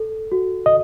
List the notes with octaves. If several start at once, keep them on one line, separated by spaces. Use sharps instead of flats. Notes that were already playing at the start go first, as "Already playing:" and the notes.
Already playing: A4
F#4
D#5